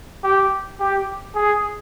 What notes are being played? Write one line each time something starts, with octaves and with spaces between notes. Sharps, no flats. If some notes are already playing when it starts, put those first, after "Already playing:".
G4
G4
G#4